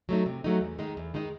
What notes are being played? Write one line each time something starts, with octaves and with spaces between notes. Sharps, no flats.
F#3 A3 D#4
C3
F#3 A3 D#4
E2
D#3 G#3 D#4
E2
D#3 G#3 D#4